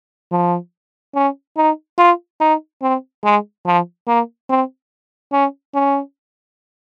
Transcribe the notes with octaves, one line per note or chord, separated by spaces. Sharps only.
F3
C#4
D#4
F4
D#4
C4
G#3
F3
A#3
C4
C#4
C#4